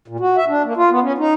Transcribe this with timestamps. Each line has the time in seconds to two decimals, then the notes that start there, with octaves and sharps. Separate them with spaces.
0.08 A#2
0.20 F#4
0.37 E5
0.48 D4
0.64 A#3
0.77 F4
0.91 B3
1.03 C#4
1.18 D#4